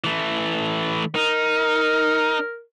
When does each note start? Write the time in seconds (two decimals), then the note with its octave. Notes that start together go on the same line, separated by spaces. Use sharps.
0.04 E3 A3
1.15 D#4 A#4